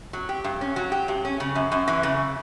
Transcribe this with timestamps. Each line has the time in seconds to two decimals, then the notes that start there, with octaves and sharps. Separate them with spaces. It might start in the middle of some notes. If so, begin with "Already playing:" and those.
0.13 F#3
0.29 G4
0.44 G2
0.61 C#4
0.76 F#3
0.92 G4
1.08 G2
1.25 C#4
1.40 C#3
1.55 F#2
1.72 F#2
1.88 E3
2.03 C#3